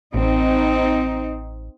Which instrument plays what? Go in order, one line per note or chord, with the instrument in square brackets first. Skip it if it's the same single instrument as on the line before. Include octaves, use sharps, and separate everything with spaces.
[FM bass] A1 [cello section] C4 D#4